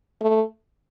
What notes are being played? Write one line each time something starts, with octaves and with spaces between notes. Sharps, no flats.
A3